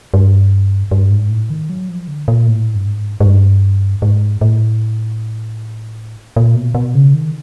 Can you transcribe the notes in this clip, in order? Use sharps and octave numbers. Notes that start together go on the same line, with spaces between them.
G2
G2
G#2
A2
D#3
F#3
F3
D3
A#2
A2
G2
G#2
G#2
G2
G#2
A2
A#2
B2
B2
C#3
D#3